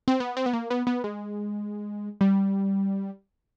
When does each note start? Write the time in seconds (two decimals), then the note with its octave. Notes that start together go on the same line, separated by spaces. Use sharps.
0.08 C4
0.20 B3
0.37 C4
0.46 B3
0.53 A#3
0.70 B3
0.87 B3
1.04 G#3
2.21 G3